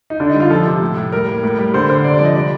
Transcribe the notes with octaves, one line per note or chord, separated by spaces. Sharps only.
D#4
D3 D4
D#4
G3
F4
F3 A4
C3
A2
A2
G3 A#4
A#3
A2 A#4
G3
D3 C5
D3 C5
C3 D5
D5
F3
D#5
G3 D5